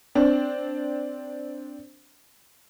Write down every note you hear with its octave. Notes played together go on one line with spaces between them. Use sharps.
C4 D4